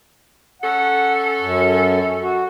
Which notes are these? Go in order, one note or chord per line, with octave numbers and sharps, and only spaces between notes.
C#4 A4 F#5
F#2
F#4